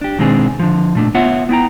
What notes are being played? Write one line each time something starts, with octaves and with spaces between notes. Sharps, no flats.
D4 G4
B2 D#3 G#3 C4 D4 G#4
D3 F3
A#2 A3 D4
B3 F4 C#5 E5 F#5
B3 E4 G5 A#5